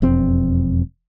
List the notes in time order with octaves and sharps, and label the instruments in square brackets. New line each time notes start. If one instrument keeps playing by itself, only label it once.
[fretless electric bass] E1 F2 C4